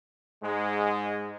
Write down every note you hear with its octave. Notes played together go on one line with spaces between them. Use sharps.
G#2 G#3